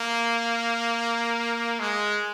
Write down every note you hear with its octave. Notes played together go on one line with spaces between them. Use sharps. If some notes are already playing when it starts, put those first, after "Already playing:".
Already playing: A#3
G#3